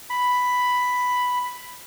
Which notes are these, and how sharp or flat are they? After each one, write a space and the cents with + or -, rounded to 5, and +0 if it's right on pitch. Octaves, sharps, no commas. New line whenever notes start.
B5 +5